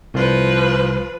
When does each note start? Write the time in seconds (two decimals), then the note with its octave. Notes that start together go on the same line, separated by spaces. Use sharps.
0.14 C2 F3 B4